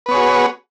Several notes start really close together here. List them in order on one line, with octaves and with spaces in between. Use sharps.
B4 B3 C#5 G#4 F#4